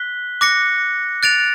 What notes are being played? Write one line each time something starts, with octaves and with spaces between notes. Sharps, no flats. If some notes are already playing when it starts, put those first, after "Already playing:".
Already playing: F#6 B6 G7
D6 F#6 A#6 C#7
F#6 A6 D7 F7